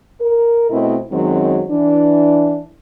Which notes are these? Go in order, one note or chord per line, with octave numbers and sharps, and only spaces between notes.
A#4
B2 A3 C4 E4 D#5
F#2 D#3 F#3 G#3 C4
E3 D4